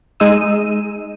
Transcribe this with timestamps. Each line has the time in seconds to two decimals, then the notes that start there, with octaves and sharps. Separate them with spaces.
0.20 G#3 D#4 D#5 E6 D#7